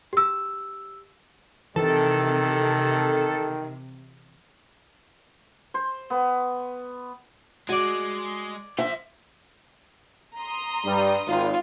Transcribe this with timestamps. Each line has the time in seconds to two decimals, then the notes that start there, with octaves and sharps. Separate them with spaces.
0.13 G4 E6
1.76 C3 D#3 E3 A4
5.74 C5
6.10 B3
7.69 G#3 F#4 D5 G#5
8.78 F4 C5 E5
10.38 A#5 C6 D#6
10.85 G2 G3
11.27 G#1 F4